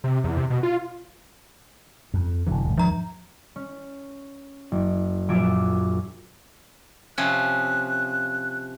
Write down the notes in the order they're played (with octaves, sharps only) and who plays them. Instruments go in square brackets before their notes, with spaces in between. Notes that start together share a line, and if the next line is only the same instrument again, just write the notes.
[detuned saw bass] C3
E2
C3
B2
F4
[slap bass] F2
[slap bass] E1 D3 [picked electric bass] E2 E3 F#3
[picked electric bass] D#2 G#2
[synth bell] F3 A#5
[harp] C#4
F#1
A#1 F#2 F3 D6 E6 G#6
[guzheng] C3 F3 C#4 [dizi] F#6